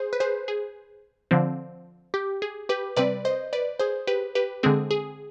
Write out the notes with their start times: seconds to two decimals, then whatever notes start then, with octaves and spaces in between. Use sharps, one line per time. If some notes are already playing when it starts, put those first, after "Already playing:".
Already playing: G#4 C5
0.13 B4
0.20 G#4 C5
0.48 G#4
1.31 D3 F3 C4
2.14 G4
2.42 G#4
2.69 G4 B4
2.96 C3 G3 C4 B4 D5
3.25 C5 D#5
3.53 B4 D5
3.79 G#4 C5
4.07 G4 B4
4.35 G4 B4
4.63 D3 G#3 C4 G#4
4.91 G#4